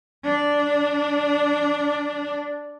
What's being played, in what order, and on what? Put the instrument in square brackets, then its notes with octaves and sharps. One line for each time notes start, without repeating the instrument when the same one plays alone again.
[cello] D4 D5